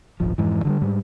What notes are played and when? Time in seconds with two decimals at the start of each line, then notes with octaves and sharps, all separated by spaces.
0.20 D#1 G#1 F3
0.38 F2 G#2 E3
0.65 D3 F3 G3
0.81 G#2 G3